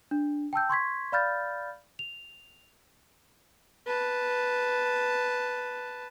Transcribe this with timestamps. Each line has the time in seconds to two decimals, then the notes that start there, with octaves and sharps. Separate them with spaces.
0.11 D4
0.53 G5 A5 E6 G6
0.69 C6 C#6 G#6 B6
1.12 D5 F5 B5 F6 G6 A6
1.99 F7
3.87 B4 A5